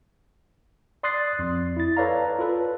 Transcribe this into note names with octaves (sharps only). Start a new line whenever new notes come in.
D5 C6 D#6 F#6 A6 C7
F2
E4 A6
A4 B4 C#5 D5 F5 A#5
F4 A4 B4